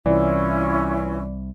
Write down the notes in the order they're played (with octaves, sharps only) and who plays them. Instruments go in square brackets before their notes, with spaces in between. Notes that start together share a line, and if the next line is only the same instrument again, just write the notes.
[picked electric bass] C2 [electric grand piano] E3 [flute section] C#4 E4 F4 [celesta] D5